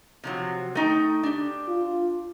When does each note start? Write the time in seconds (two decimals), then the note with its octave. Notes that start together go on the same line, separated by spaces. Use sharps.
0.24 C3 F3 F#3
0.75 A3 D#4 G5
1.23 D4 G4
1.68 F4